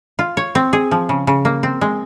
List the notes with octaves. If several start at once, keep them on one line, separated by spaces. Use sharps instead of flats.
F4
C#5
C4
G#4
F3
C#3
C#3
A#3
C4
G#3